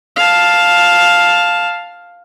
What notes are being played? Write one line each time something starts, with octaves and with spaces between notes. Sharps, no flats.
F5 A5